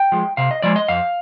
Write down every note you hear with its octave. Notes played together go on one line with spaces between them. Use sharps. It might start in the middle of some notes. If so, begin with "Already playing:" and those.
Already playing: G5
F3 G#3
C3 F5
D#5
F3 G#3 D5
D#5
F2 F5